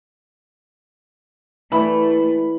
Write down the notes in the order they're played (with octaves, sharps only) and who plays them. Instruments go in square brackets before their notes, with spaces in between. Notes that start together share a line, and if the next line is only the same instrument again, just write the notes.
[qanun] E3 G3 E4 [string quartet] A3 [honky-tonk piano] B5